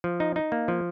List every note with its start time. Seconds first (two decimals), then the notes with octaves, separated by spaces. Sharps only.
0.04 F3
0.20 D#4
0.36 D#4
0.52 A#3
0.68 F3